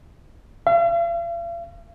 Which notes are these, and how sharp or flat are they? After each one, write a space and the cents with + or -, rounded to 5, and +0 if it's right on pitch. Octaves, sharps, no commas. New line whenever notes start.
F5 -45